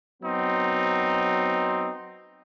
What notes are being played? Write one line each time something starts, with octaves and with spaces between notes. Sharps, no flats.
F#3 B3 C4 D#4